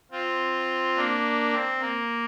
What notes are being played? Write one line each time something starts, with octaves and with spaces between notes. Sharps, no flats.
C4 F4
A#3 D4
C4
A#3